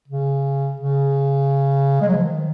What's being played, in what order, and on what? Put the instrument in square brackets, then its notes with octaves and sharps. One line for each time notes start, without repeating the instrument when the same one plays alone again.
[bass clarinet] C#3
C#3
G#3
F#3
F3
D#3